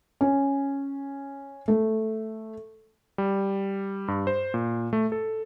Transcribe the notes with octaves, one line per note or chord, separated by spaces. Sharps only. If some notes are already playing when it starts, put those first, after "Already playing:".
C#4
A3
G3
G2
C5
A#2
A3
A4